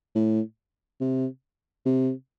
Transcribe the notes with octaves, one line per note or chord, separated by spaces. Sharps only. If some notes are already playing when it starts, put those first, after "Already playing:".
A2
C3
C3